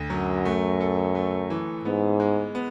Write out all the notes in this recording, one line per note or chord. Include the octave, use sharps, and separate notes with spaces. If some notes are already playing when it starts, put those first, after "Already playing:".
Already playing: D2 D3
F#2 F#3
A3
A4
A3
E3
G#2 B3
G#3
B3